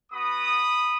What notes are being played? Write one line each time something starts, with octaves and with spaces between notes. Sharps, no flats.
B3 F#4 B5 D#6